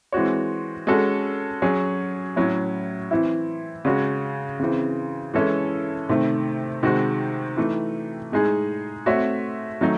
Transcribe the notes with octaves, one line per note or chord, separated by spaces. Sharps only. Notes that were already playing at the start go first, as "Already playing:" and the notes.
E3 G#3 C4 F#4 C#5
G#3 C#4 F#4 A4
F#3 C#4 G#4 C#5
A2 F#3 C#4 E4
E3 C4 E4
C#3 G#3 C#4 F#4 C#5
C#3 E3 C4
E3 G#3 C#4 E4 A4
C3 D#3 A3
C3 D#3 G#3 D#4 F#4
E3 A3 D#4
A2 G#3 D#4 G#4
A3 C4 F#4 C#5 E5
D#3 F#3 A3 D#4